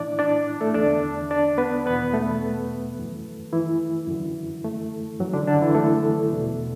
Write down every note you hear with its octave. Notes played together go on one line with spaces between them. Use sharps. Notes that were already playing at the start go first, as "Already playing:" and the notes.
Already playing: A2 E3 D4 E4 D5
D4 D5
A3 A4
E2 D3 D4 D5
D4 D5
B3 B4
E2 B2 B3 B4
A3 A4
F#2 E3
E3 E4
F#2 D3
A3
F#2 E3 F#3
D3 D4
D3 D4
E3 E4
A3 A4
E2 B2